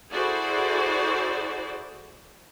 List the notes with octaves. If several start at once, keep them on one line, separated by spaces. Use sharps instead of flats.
E4 F#4 G#4 A4 C5 D5